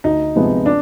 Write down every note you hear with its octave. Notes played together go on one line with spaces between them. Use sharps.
D2 D#4
C3 F3 G#3 B3
D4